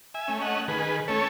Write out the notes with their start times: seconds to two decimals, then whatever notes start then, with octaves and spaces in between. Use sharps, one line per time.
0.14 E5 G#5
0.28 A3 C#4
0.41 D#5 F#5
0.68 D#3 G#4 B4
1.08 A3 C#4 A4 C#5